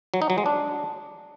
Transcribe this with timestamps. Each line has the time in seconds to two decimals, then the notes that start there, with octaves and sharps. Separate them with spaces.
0.14 F#3
0.22 D#4
0.30 F#3
0.38 G#3
0.46 D4